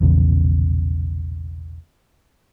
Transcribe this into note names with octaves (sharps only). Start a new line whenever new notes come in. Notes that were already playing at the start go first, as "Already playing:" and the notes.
E1 A#1 E2 C#3